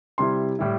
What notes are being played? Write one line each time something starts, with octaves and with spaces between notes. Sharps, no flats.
C3 G3 E4 C6
A2 G3 E4